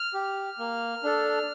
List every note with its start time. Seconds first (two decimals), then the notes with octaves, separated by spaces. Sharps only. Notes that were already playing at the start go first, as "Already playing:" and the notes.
Already playing: F6
0.14 G4
0.59 A#3
1.03 D4 A4